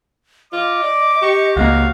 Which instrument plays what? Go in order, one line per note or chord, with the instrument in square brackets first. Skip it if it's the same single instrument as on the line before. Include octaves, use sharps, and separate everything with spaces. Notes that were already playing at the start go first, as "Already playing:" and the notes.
[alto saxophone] F4 [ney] D#5 [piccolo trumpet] D6
[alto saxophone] D5
[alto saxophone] G4 [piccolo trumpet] C#6
[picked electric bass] C#2 G3 A#3 [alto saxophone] F#4 [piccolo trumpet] F5